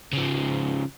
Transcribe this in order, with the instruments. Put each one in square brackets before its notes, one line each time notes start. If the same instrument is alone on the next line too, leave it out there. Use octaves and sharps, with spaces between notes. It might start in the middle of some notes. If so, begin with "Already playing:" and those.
[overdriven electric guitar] C#3 F3